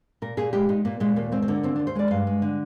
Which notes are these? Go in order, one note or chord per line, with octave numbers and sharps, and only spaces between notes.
A#2 A#4
A#2 G#4
G#3 G4
G#3 D#4
A#2 A#3
A#2 G#3
D#2 A#3
G#3 C4
C4
D3 A#3
D#2 C4
D4
D#2
C5
G#3 D5
G2 F5
G#3
D3